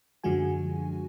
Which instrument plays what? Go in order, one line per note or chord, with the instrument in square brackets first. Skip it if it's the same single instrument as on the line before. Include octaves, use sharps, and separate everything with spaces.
[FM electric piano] F#2 D3 F3 G#3 F#4 G#5